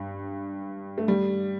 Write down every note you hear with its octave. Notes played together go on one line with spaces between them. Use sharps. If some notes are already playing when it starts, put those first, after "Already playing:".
Already playing: G2
A3
G3